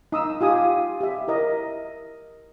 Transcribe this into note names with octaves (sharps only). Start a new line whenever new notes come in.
D#4 D#6 E6
F4 G4 G#5 D#6
G4 E5
E4 A#4 D#5